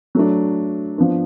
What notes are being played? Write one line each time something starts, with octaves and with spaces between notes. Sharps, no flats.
F#3 A3 D4
F3 B3 D4